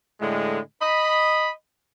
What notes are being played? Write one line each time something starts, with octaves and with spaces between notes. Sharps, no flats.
A2 D3 G#3
D#5 B5